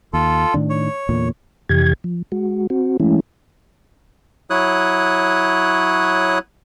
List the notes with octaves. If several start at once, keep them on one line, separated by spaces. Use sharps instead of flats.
D#2 F4 A4
A2 D#3 D4
C#5
E2 A#2 D3
F2 C3 E3 G4 G#6
F3
G#3 F#4
C4 F#4
E3 G#3 A3 C#4 E4
F#3 E4 C#5 D#6 F#6